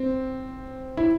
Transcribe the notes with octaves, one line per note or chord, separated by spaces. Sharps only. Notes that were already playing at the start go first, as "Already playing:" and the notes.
Already playing: C4
E4